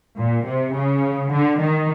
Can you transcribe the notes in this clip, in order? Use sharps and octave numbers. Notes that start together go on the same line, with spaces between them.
A#2
C3
C#3
D3
D#3